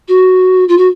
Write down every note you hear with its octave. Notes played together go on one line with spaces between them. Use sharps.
F#4
F4
F#4